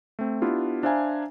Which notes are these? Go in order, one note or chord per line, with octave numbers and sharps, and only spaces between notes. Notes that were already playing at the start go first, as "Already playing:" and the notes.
A3 C4
B3 D4 E4 F4 G4
D4 C5 E5 F5 G#5 A#5